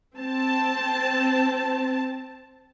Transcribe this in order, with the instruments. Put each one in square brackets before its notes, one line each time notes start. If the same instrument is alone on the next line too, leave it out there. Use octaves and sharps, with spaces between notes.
[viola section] C4 A5